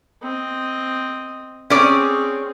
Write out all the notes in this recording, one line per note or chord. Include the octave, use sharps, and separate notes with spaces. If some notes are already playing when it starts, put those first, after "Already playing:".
C4 D#5
C4 C#4 G#4 D5